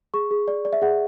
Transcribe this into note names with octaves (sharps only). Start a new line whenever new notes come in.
G#4 C#6
G#4
D5
D5
E5
G#4 F#5